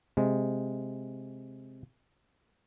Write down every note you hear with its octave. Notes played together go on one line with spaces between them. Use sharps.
C3 G#3